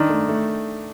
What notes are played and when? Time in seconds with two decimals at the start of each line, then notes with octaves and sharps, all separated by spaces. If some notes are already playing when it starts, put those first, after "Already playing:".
Already playing: D#3 D4
0.10 A3
0.29 A3